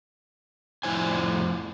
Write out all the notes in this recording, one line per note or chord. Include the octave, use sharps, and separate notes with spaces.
F2 A2 G3 E4 C5 G#5